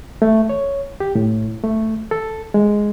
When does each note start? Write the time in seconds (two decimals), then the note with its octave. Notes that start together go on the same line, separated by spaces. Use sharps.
0.22 A3
0.49 C#5
1.00 G4
1.15 A2
1.63 A3
2.11 A4
2.54 G#3